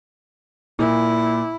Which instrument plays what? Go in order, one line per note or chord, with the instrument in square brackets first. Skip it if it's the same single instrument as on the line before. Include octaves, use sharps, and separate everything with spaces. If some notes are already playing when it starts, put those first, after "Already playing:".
[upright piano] A#2 [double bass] E4